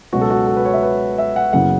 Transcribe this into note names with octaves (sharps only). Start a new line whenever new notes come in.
C#2 B2 F#3 C#4 F#4
A4
F#4
A4
B4
C#5
E5
B4
E5
F#5
F#1 F#2 C#3 E3 B3 F#5